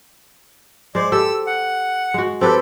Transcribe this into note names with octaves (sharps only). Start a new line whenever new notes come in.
G#3 C5 D5
G4 A4 E6
F#5
G#3 F#4
C4 G4 A4 B4